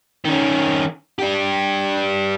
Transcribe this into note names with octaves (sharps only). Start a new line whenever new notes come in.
D#3 C#4
D4 G4